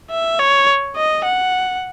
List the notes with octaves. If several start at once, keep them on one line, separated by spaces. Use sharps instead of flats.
E5
C#5
D#5
F#5